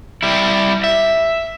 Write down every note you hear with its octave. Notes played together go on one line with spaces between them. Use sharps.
G3 E4
E5